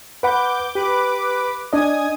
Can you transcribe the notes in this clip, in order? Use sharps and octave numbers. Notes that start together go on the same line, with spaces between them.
B4 F#5 B5 D6 G6
G4 B4 B5 D6
D4 D#5 G#5 D#6 G#6